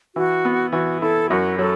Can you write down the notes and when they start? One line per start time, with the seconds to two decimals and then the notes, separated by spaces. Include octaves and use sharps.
0.16 E3 F#4
0.45 B3
0.73 E3 F#4
1.01 E4 A4
1.30 F#2 F#4
1.59 F#3 A4